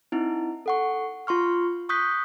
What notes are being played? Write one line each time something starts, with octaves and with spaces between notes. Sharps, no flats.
C4 D#4 E4
A4 F#5 C#6
F4 C6 C#6 F6
C#6 D#6 F#6 G6 B6